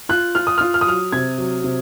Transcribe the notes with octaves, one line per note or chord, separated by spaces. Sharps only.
F4 F#6
F4 F6
D#6
F4 F6
F6
D#6
F#3 F6
C3 G#6
F#3
C3